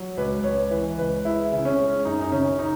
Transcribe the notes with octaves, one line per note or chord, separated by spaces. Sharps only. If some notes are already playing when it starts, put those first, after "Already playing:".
Already playing: F#3
C#2 B4
C#2 C#5
E3 B4
C#2 B4
G#3 E4
C#3
C#4
G#3
F#2 D#4
D#4
C#3 C#4
D#4